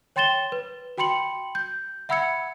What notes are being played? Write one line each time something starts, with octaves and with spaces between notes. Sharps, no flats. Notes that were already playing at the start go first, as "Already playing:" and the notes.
C#5 G5 C6 A6 E7 G7
B4
F#4 G5 B5 C6 C#7 F#7
G6
E5 F#5 B5 E6 G#6 C#7